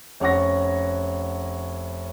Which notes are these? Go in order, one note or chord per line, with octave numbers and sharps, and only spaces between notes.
F1 C#4 F#5 C#6 A#6